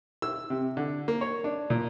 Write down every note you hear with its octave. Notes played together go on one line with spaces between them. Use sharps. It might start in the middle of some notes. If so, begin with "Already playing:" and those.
E6
C3
D3
A#3
C#5
D4
A#2